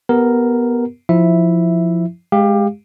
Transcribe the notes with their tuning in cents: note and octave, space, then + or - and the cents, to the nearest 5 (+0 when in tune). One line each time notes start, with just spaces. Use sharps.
B3 -10 G4 +0 A#4 +0
F3 +0 E4 -5 E5 +0
G#3 +0 G4 +25 F5 +0